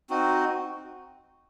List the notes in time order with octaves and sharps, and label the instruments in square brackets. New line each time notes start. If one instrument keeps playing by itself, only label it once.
[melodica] C4 D#4 F#4